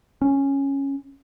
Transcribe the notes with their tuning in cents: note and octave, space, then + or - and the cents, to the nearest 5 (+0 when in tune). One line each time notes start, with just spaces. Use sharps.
C#4 -5